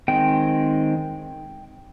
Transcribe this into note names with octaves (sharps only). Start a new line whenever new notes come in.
D#3 G#3 C4 G5